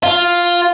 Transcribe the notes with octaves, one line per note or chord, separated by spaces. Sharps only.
F4